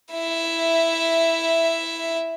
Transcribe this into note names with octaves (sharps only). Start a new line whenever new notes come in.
E4 E5